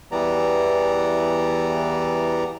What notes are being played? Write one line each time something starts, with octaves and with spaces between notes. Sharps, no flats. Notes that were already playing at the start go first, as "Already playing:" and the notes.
E2 E3 G3 B3 D5 A#5